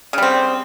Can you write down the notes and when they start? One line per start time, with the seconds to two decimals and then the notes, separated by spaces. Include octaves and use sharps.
0.13 C#3
0.18 G3
0.22 C4